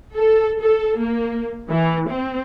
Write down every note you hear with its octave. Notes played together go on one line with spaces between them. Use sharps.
A4
A4
A#3
E3
C4